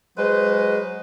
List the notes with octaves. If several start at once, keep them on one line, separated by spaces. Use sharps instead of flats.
F#3 G#3 B4 C5